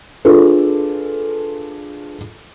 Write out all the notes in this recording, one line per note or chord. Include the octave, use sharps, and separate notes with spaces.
D4 F4 G#4 A4 B4